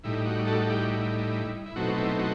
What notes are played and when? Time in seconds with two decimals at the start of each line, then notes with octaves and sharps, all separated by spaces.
0.04 A2 G3 D#4 E4
0.26 F#4
0.47 F#4 A4
0.62 A4
0.68 E4 G4
0.80 F#4
0.90 E4
1.66 E4
1.76 B2 F#3 A3 C4 D#4 F#4
1.97 E4
2.19 F#4